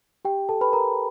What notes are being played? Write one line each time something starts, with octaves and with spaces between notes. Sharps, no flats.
G4 G5
A4 A5
B4 B5
A#4 A#5